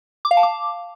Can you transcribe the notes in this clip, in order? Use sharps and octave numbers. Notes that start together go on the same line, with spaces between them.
D6
F5
A5
D6